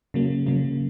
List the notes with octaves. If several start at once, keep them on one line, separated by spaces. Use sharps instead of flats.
C#3 F#3 A#3
C#3 F#3 A#3